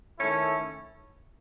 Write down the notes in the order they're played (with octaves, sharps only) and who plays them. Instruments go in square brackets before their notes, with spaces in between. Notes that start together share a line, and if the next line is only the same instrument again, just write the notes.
[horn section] D#3 A3 C#4 E4 A4